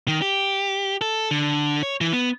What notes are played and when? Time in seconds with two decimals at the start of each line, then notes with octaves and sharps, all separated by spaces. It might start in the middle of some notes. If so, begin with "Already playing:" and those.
0.08 D#3
0.22 G4
1.01 A4
1.31 D3
1.83 C#5
2.01 E3
2.13 B3